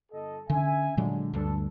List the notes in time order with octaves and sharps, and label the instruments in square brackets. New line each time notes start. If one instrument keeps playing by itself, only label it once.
[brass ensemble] G1 A4 D#5
[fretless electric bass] D3 [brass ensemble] C#4 E5 G#5
[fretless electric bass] A#2 F#3 G#3 [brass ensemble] D3
[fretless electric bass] D2 G2 [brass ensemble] D4 A4